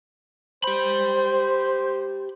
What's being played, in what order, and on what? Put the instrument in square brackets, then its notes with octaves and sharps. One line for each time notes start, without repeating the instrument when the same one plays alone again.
[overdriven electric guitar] G4 B5 [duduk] C5